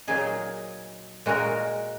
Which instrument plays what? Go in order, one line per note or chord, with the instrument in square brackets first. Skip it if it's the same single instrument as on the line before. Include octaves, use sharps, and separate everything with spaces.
[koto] A#2 F#3 D#4 G#4
A#2 G#3 F#4 A#4